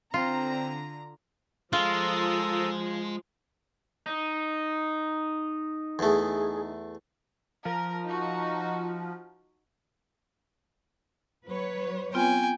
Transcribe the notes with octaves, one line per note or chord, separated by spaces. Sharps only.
D3 C4 F4 A#5
F3 G#3 F4 A4 A#5 D#6
D#4
E2 A3 G#4
F3 A#4
D#4 F#4
F#3 B4 C#5
B3 C4 F4 G5 G#5